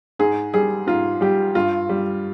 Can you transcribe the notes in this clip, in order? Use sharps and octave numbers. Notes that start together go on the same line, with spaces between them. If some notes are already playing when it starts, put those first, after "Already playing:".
G#2 G#4
G3 G#4
G#2 F4
G3 G4
G2 F4
G3